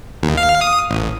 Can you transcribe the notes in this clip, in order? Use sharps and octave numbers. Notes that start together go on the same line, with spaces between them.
D#2
F5
D#6
A1